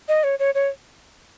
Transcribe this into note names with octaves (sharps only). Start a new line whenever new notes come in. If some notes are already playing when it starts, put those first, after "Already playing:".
D#5
C#5
C#5
C#5